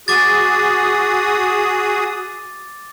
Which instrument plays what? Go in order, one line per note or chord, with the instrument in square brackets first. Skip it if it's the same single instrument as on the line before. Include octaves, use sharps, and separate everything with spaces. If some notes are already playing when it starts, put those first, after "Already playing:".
[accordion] F#4 G#4 D#6 [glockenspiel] D6 A6